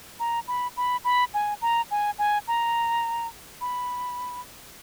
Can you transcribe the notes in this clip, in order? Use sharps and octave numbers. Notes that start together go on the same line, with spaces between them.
A#5
B5
B5
B5
G#5
A#5
G#5
G#5
A#5
B5